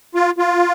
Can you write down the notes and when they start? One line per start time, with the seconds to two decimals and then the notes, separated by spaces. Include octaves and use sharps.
0.15 F4
0.38 F4